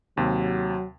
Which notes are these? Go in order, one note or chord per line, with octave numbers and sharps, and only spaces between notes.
D#2 C3 F#3